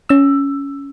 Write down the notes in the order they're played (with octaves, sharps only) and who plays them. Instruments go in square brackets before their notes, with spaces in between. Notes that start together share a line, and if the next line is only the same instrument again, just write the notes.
[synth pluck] C#4 E6